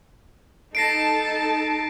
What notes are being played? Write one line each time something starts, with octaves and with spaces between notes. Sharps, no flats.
D#4 A4 A5 A#6 C7 D7